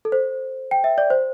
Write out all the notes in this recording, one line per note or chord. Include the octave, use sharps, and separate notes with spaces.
A4
C5
G5
E5
D5
C5